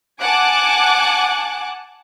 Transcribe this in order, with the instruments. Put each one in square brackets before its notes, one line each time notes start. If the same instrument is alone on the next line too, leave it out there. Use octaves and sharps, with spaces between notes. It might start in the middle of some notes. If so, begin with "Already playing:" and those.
[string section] F#5 G#5 A5 D6 F#6